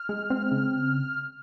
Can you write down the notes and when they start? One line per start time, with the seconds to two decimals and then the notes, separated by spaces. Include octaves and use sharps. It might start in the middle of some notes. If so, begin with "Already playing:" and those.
Already playing: F6
0.09 G#3
0.30 C4
0.52 C#3